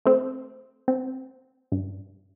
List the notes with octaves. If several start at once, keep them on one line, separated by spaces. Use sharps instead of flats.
A3 C4
C4
G2